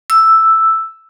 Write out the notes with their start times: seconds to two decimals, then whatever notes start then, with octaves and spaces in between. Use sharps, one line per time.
0.10 E6